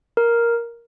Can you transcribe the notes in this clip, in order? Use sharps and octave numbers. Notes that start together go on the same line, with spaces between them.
A#4